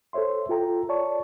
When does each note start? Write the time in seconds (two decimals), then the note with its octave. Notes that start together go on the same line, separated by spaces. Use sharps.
0.13 A4 C5 C#5 E5 C6
0.49 F4 A4 G5 A#5
0.89 C#5 D5 A5 C#6